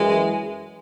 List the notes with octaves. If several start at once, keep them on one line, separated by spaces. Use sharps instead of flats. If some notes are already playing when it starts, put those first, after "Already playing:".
Already playing: F#2 E3 G#3